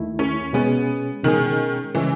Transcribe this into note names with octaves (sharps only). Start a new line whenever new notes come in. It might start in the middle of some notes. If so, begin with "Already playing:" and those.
Already playing: D#2 D#3 A3 E4
C#4
B2 G#3 B3 C#4 G#4
B2 D#3 G#3 C#4 G#4
C#3 E3 G#3 C#4